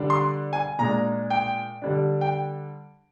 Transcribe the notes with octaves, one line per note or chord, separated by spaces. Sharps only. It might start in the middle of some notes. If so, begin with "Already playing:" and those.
Already playing: D3 G3 D4
C6
G#5
A#2 G#3 D4 A#5
G5
D3 G3 D4
G5